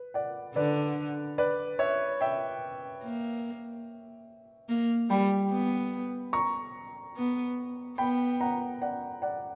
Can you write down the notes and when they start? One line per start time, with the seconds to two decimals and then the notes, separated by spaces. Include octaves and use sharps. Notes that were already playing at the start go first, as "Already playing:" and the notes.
Already playing: B4
0.14 D5 F#5
0.55 D3 B4 D5
1.38 B4 D5
1.79 C#5 E5
2.21 E5 G5
3.03 A#3
4.69 A#3
5.10 G3 G5 B5
5.51 B3
6.33 A#5 C#6
7.17 B3
7.98 B3 G5 B5
8.41 F#5 A#5
8.82 D5 F#5
9.22 D5 F#5